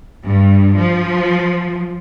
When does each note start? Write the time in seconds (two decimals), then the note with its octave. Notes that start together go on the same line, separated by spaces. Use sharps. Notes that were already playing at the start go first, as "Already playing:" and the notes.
0.24 G2
0.79 F3